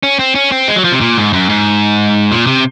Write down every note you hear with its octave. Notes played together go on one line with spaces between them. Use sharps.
C#4
C4
C#4
C4
G#3
F#3
F3
C3
A#2
G#2
F#2
G#2
A#2
C3